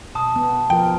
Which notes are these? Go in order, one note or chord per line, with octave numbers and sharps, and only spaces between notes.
B2 A5 D#6
B3
F3 F4 A#4 G5